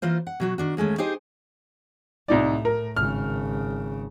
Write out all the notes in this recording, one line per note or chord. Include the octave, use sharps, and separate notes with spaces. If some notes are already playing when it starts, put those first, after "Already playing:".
E3 A#3 F4 C5
F#5
B2 F#3 F#4
D#3 D4 F#4
D#2 G#3 A3 C#4
D#4 G4 G#4 C5 D#5
C2 A2 D#4 D5
A#4
G#1 C#3 F6